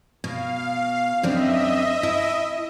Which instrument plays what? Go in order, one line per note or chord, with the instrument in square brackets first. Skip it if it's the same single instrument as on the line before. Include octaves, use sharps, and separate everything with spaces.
[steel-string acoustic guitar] B2 [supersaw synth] F5
[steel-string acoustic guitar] F#2 C4 D4 [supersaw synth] D#5 E5
[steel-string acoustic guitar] E4 A5